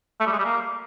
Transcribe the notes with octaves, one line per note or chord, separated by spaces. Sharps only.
A3
G3
G#3
G3
A#3